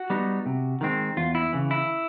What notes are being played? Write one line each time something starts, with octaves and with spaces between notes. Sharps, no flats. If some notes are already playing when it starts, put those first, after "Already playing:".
Already playing: F#4
G3 B3 D#4
C3
D#3 G#3 C4
E2 F4
E4
C#3 E3
E4